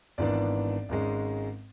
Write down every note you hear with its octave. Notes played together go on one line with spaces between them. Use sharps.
G#1 G#2 E3 B3 D4 D5
G#1 G#2 G#3 C#4